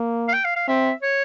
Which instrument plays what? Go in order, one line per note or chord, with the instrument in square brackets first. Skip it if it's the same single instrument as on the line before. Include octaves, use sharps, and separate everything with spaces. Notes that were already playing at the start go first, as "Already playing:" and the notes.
Already playing: [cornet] A#3
[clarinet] F5
G5
F5
F5
[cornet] C4 [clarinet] E5
[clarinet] C#5